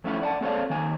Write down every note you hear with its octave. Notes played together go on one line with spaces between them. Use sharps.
F2 A3 C#4 E4 F#5
D5 F#5 A5
A#3 C4 A4 C#5 D5 F5
D#3 A#3 G#5